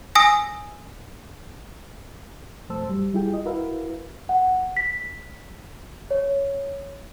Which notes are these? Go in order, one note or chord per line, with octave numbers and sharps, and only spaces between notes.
G#5 D#6 E6 A#6
F2 B2 A3 C5 A5 E6
G2 F#3 G3
G3 E4 F4 G#4 G5
D#5
E4 F#4 A#4 B4 E5 F5
F#5
B6
C#5